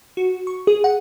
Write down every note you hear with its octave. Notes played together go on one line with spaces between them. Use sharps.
F#4
C#6
G#4
F#5